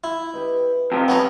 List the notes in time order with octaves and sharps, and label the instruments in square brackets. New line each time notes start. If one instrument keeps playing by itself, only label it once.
[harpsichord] E4
[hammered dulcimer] G4 B4 D#5
[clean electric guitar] F2 C3 F3
[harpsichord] B3 C#5 A#5